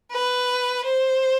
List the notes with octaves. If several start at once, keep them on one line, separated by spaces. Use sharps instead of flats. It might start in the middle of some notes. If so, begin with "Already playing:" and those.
B4
C5